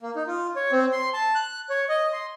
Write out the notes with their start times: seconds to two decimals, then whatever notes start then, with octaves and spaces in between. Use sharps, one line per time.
0.01 A#3
0.16 D#4
0.27 F4
0.56 C#5
0.72 C4
0.92 C6
1.14 A5
1.35 F#6
1.70 C#5
1.89 D#5
2.13 C6